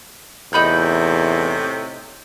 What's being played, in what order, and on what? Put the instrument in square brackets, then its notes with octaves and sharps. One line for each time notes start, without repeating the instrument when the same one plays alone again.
[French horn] E2 [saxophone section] A2 C3 [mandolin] D#4 B5 G6